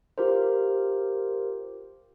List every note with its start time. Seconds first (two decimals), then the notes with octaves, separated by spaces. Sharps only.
0.18 F4 G4 A#4 C5